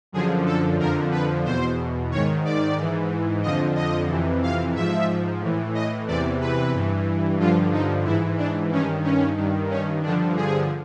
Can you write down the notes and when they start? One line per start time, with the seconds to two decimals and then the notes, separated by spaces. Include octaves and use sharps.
0.12 F#2 D3 F3 G#4
0.46 A4
0.79 F2 D3 F3 A#4
1.11 B4
1.45 E2 B2 C5
2.11 G#2 D#3 C#5
2.45 D5
2.77 G#2 E3
3.43 F2 D3 F3 D#5
3.76 D#5
4.09 F2 C3 E3
4.43 F5
4.75 G#2 F3 E5
5.41 A2 E3
5.75 D#5
6.07 E2 C3 E3 D5
6.41 B4
6.74 G2 E3
7.39 G2 D3 F3 F4
7.73 D#4
8.05 G#2 E3 E4
8.38 D4
8.71 G2 D#3 C#4
9.04 C#4
9.37 G2 D#3
9.70 C#4
10.03 G2 D3 F3 D4
10.36 G#4